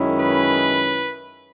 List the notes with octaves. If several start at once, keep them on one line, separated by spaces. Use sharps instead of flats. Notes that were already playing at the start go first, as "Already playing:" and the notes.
Already playing: F#2 D#3 G#3 C#4 E4
B4